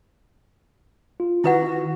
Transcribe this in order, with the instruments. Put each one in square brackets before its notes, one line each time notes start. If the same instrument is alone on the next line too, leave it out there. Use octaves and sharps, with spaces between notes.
[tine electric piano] F4
[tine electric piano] D#3 [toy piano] E4 B4 F#5 [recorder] F#4